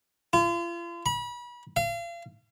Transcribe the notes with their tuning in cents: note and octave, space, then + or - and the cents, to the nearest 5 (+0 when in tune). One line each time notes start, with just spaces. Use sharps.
F4 -40
B5 -35
F5 -35